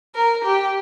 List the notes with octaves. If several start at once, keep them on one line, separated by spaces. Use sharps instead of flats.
A#4
G4